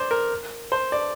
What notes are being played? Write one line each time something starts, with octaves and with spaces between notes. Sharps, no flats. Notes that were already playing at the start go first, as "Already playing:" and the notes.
Already playing: C5 D5
A#4
C5
D5